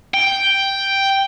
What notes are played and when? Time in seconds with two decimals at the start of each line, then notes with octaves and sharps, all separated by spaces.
0.14 G5